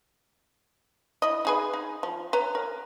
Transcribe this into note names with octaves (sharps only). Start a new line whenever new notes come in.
E4 D#5
D#4 G#4 B4
D#4
F3
B4 C#5 A#5
A#4